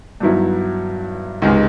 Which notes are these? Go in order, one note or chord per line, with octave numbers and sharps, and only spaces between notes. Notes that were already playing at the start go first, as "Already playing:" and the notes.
G2 D#3 F#3 B3 E4
C#2 C3 D#3 G#3